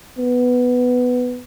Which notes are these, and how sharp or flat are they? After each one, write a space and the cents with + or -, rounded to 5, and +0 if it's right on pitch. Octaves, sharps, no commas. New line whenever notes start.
B3 +5